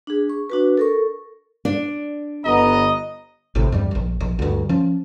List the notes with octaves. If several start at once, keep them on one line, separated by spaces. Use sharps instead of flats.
D4 G#4
C#6
D4 F#4 B4
A4 A#4 C#6
D4
G1 B3 D#5 A#5
G#1 A2 C3
E2 G2 G3
D1 A#1
A#1
D2 G2
F3 C#4